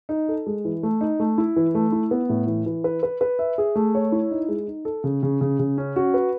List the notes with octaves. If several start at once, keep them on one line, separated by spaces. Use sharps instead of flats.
D#4
A4
G#3
E3
A3
D#4
A3
E4
E3
A3
E4
B3
A2
E3
E3
B4
B4
B4
E5
G#4
A3
C#5
E4
D#4
G#3
D#4
A4
C#3
C#3
C#3
C#3
C#4
F#4
B4